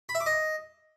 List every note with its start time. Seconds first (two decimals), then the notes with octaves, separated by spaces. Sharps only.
0.09 B5
0.15 E5
0.21 D6
0.26 D#5